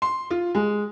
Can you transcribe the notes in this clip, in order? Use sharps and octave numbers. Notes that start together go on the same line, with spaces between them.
C6
F4
G#3